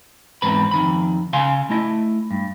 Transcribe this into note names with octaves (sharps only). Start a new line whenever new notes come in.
E2 G#2 C4 B4 B5
F2 D#3 B5
C#3 F5 G#5 C6
A3 E4 D#5
G2